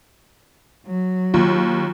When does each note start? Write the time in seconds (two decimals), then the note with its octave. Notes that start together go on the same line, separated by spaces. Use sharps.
0.86 F#3
1.34 D#2 F4